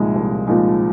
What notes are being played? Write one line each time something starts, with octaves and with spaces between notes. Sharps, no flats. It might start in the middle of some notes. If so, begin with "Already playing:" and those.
Already playing: C2 A#2 F3 G#3 D#4
C2
A#2 F3 G#3 D#4